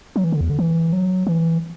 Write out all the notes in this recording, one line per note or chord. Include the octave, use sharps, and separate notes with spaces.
F#3
E3
D3
E2
D3
E3
F#3
E3